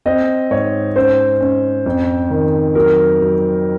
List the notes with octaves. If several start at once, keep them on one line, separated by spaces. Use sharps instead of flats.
C4 D#5
G#2 C#5
C#4 C5
C#4
F2
D#3
F#3 A#4
F#3